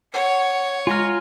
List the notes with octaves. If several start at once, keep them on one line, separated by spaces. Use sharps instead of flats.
C#5 F#5
G#3 F4 G#5 A#5 C6 F6